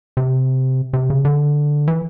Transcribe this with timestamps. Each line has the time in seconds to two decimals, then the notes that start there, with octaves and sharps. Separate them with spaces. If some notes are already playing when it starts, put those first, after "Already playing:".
0.17 C3
0.93 C3
1.10 C#3
1.25 D3
1.88 E3